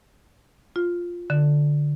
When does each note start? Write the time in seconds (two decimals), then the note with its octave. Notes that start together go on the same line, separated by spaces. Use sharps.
0.76 F4
1.30 D3